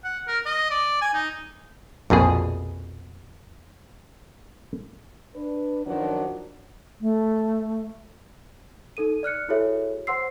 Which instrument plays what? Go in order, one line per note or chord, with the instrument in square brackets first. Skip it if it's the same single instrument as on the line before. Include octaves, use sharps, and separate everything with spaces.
[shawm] F#5
A#4
D#5
D5
G#5
D#4
[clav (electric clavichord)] A#1 F2 B2 G#4
[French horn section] D4 B4
F#2 D#3 F3 F#3 D4 F#4
[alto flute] A3
[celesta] D#4 A4 D#7
D5 F6 F#6 C#7
E4 F#4 G#4 A4 C#5 E5
C5 F#5 C6 E6 C7